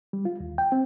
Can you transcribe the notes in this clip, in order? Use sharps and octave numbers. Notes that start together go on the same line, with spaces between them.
G3
F4
D#2
G5
C4